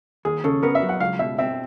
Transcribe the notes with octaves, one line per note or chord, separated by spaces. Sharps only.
D#2 G#4
C#3 A4
B3 A#4
E5
F#3
F#5
C#2 F5
B2 E5
C4 E5